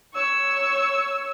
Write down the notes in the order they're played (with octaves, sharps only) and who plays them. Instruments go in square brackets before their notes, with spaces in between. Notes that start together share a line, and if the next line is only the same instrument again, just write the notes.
[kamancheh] C#5 E6